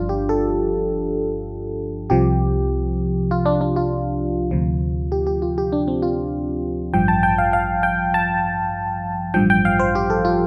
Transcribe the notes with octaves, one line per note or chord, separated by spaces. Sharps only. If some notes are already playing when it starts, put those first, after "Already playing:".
Already playing: G1 G2 F3 D4 F4
G4
A4
C2 C3 F3 G4
F4
D4
D4
F4
D2 C3 F3
G4
G4
F4
G4
D4
C4
F4
A1 G2 F3 G5
A5
G5
F5
F5
G5
A5
A1 G2 F3 G5
G5
F5
C5
G4
A4
F4